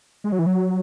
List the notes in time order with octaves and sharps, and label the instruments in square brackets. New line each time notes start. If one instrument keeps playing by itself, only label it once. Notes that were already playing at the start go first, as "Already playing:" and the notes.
[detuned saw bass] G#3
F#3
E3
F#3